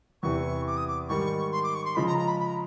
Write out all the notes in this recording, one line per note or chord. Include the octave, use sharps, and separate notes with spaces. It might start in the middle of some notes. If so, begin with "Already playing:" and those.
E2 C3 E3 C#6
D6
D#6
D6
G#2 D#3 G3 C#6
C6
D6
C#6
C6
C#3 F3 G#3 B5
A#5
A#5
B5
B5
A#5